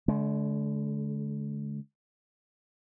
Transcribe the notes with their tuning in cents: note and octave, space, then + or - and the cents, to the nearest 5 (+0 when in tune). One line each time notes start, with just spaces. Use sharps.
D3 -25 G#3 +40